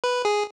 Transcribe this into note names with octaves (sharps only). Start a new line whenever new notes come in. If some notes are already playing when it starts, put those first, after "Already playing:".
B4
G#4